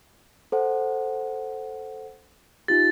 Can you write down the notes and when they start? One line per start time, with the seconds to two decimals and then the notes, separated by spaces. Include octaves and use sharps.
0.52 A4 C5 F#5
2.68 D#4 F4 G4 A6